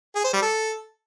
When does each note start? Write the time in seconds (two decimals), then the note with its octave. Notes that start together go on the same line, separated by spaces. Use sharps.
0.16 G#4
0.24 C5
0.33 G3
0.42 A4